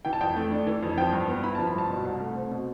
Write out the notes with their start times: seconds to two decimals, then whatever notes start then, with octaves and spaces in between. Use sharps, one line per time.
0.05 E3 G5
0.13 A5
0.21 F2 G5
0.36 A3
0.52 D4
0.67 E3
0.83 F2
0.97 F3 G5
1.12 G2
1.28 B3
1.43 E4 B5
1.55 A5
1.59 F3
1.67 B5
1.75 G2 A5
1.89 B2
2.05 C2
2.20 A3
2.35 C4
2.51 B2